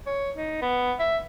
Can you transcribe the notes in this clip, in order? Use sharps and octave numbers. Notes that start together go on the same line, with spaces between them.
C#5
D#4
B3
E5